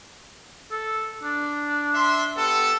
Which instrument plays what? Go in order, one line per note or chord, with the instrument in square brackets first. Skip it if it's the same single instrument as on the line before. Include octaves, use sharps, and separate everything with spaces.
[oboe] A4
D4
[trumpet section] E5 C6
B3 G4 A4